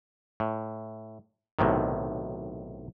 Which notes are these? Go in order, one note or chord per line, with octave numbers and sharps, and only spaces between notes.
A2
B1 A2 C3 D#3